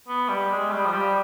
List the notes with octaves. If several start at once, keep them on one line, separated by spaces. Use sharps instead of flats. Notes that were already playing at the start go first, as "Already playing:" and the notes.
B3
G3
G#3
G3
F3
G3